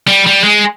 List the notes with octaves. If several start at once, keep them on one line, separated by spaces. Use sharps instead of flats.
G3
G3
G#3